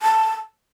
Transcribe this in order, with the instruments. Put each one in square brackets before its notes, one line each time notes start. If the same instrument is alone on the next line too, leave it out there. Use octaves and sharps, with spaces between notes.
[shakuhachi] A5